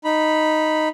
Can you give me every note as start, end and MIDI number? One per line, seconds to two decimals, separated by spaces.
0.05 0.88 63
0.05 0.88 83